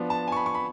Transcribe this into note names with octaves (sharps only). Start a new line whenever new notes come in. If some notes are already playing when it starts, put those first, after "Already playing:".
Already playing: F3 B3 D4
A5
G#5
C#6
B5
C#6
B5